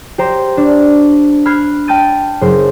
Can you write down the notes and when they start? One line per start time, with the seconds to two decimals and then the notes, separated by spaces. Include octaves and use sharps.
0.18 G4 C5 A#5
0.57 D4
1.45 B5 F6 F#6 G#6 C7
1.88 G5 A5 F6 G6 A6 D#7
2.41 F#1 C5